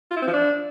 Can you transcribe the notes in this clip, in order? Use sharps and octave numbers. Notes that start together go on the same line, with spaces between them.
F4
E4
C4
F3
D4